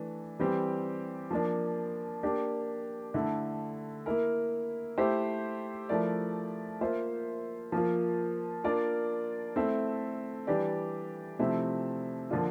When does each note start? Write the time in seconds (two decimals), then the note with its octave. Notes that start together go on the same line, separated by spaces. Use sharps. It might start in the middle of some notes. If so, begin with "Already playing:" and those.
Already playing: E3 A3 D4
0.39 E3 G3 C4 G4
1.31 F3 A#3 D4
2.23 A#3 D4 G4
3.14 D3 A3 E4
4.06 A#3 E4 A#4
4.98 A3 E4 G4 C5
5.89 F3 A3 E4 A#4 D5
6.81 A#3 F4 C5 E5
7.72 F3 A#3 F4
8.64 A#3 D4 F4 A#4 D5
9.56 A3 C4 E4 A4 E5
10.47 E3 G3 D4 G4 D5
11.39 C3 F3 A3 C4 E4
12.31 D3 F3 A#3 D4 F4